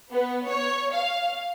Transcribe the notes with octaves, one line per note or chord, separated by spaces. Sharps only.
B3
C#5
F5